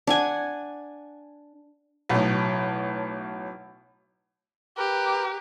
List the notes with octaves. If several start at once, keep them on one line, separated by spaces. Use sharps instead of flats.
D4 F#5 G#5
B1 A2
G4 A#4 B4